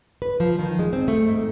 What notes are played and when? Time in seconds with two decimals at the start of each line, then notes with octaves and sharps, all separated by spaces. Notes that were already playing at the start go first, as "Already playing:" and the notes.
0.22 B4
0.40 F3
0.59 D#3
0.79 G#3
0.93 C4
1.08 A3
1.28 G#2